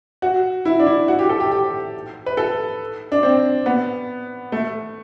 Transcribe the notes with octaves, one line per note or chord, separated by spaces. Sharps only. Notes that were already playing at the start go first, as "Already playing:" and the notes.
F#4
E4
D4
E4
F#4
G4
A4
G4
G4
B4
A4
D4
C4
B3
A3